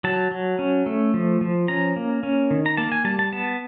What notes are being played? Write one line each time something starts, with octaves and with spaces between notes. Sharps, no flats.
F#3 A5
F#3
C#4
A3
F3
F3
C#4 A#5
A#3
C#4
D#3
A#5
A#3 A5
G#5
G3 A5
A5
B3 A5